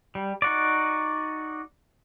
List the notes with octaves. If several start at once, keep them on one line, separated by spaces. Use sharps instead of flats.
G3
D#4 F#4 D5